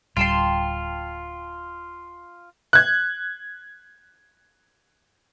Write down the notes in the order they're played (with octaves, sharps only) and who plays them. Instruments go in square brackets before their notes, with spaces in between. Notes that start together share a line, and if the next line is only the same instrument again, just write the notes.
[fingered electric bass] D1 G3 [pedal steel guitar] F4 [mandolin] G5 A5 C6
[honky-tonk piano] F#6 G#6